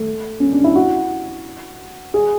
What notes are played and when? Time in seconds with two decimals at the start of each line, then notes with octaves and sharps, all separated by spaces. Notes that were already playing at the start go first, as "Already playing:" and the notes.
Already playing: A3
0.40 C#4
0.52 D4
0.64 E4
0.76 F#4
2.14 G#4